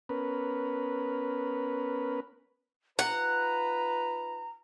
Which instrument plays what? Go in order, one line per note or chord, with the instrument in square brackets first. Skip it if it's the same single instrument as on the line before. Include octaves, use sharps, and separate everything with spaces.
[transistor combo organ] B3 C#4 A#4 B4
[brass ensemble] D#4 F4 B4 [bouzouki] F#5 [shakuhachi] A#5